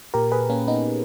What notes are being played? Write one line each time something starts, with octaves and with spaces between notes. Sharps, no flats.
A#2 G4 A#4
G#4 B4
A#3 C#4
B3 D#4